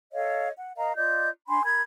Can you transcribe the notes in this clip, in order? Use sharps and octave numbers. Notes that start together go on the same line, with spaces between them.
A4 C#5 D#5 F5
F#5
A#4 D#5 F5 A#5
F4 D5 D#5 G6
D4 G#5 B5 C6
A#4 B5 G#6